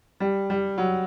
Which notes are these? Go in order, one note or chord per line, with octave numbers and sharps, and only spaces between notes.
G3
G3
F#3